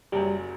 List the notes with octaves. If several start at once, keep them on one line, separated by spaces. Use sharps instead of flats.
F#1 F#2 F#3 G3